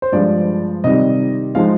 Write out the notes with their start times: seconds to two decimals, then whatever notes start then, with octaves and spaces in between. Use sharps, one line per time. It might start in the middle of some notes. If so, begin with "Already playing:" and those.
0.02 C5
0.12 G2 F3 G#3 D5
0.84 C3 D#3 G3 D#5
1.55 F3 G#3 D#4 F5